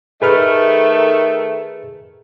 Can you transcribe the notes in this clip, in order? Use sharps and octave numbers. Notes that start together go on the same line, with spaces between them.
D#3 A3 G#4 B4 F6